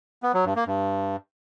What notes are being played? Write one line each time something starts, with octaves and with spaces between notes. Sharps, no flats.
B3
F#3
G2
A#3
G2